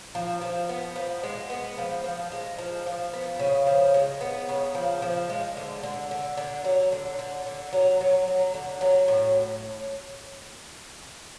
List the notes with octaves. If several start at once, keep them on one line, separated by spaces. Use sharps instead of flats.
F3
F3
B3
F3
G#3
B3
F3
F3
G#3
F3
F3
B3
C#3
F3
G#3
B3
C#3
F3
F3
G#3
D3
D3
D3
D3
F#3
D3
D3
D3
F#3
F#3
F#3
D3
F#3
A2